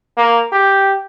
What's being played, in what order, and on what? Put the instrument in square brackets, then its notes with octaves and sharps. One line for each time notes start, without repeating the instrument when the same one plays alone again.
[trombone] A#3
G4